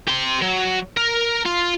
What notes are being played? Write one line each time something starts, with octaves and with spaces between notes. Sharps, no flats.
G4 C6
F#3
A#4
F4